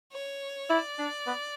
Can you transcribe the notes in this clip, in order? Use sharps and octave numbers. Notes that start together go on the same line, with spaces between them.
C#5
E4 D5
D4
B3